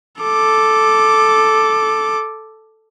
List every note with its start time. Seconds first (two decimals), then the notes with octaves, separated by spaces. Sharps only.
0.22 A4 D6